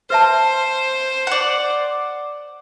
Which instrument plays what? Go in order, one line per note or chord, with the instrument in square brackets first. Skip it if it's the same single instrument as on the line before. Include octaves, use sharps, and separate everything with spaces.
[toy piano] B4 E5 A5 [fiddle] C5
[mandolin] D5 F#5